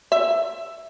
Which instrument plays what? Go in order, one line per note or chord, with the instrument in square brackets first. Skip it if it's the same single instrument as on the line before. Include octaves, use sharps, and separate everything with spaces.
[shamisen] E5